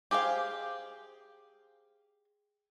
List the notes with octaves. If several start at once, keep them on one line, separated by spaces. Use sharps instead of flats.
G4 G#4 C5 F5